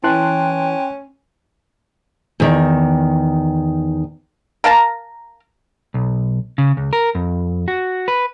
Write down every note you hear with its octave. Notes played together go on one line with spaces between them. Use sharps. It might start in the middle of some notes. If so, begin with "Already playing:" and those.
E3 C#4 G5 A5 C6 F#6
E2 D#3
A#4 F5 A5 A#5
B1
C#3
C#2
A#4
F2
F#4
B4